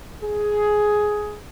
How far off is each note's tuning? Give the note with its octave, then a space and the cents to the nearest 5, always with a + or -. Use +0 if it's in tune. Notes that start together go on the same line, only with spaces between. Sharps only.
G#4 +10